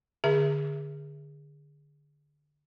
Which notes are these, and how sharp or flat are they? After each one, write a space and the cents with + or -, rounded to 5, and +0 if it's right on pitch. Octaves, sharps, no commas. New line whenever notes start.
D3 +0 G#4 -20 E5 +0